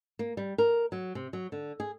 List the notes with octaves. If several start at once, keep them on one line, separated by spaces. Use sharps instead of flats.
A#3
G3
A#4
F#3
C3
F#3
D3
G#4